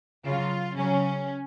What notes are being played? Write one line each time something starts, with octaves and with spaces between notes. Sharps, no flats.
C#3 F#3 F4
C#3 F#3 C#4